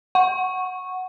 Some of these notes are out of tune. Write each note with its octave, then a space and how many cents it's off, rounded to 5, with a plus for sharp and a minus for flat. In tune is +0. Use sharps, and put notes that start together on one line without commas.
F#5 +0 C#6 -10